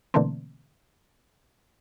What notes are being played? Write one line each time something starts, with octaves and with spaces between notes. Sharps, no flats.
B2 D3 E3 A3 A#3 C4